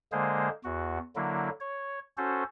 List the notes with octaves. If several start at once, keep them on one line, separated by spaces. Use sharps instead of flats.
D3 G#3 A#3 G#4 C5
E2 F#4
D3 F#3 A#3 E4
C#5
C#4 F#4 A4 C5